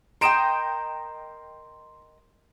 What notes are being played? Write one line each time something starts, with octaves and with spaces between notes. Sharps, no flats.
A#4 D#5 G5 C6 D7 E7